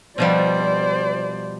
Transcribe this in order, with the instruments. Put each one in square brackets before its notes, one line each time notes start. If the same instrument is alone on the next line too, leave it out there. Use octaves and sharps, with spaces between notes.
[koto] B2 F3 G3 [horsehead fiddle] C5 D5